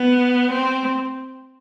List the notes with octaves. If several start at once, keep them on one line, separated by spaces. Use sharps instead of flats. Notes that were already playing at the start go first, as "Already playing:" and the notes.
Already playing: B3
C4